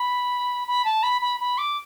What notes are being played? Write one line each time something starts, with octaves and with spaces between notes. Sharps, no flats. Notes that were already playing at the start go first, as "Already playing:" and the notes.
Already playing: B5
B5
A5
B5
B5
B5
D6